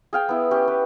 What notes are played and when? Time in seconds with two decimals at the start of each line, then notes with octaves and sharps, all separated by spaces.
0.13 G#4 F5 G5
0.29 B3 E4
0.51 C#4 G4
0.68 B4